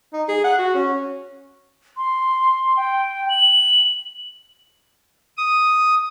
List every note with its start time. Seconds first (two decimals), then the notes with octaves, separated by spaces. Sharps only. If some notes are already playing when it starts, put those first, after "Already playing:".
0.13 D#4
0.28 G#4
0.44 F#5
0.58 F#4
0.74 C#4
1.97 C6
2.77 G5
3.29 F#7
5.37 D#6